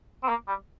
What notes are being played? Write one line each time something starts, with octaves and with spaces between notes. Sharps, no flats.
C4
A#3
G3